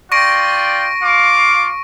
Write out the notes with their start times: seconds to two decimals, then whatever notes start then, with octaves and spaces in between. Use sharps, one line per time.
0.12 F4 D5 G5 C#6 A#6 D7
1.02 F4 F5 D6